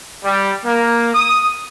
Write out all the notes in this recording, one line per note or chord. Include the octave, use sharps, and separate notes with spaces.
G3
A#3
D#6